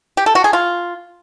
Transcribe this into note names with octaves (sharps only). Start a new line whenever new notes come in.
G4
A4
F#4
G#4
F4